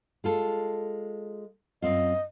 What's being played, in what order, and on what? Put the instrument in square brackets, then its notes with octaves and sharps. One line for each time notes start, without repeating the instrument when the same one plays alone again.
[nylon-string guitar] G#3 F4 A4
[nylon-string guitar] F#2 C4 F4 [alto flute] D#5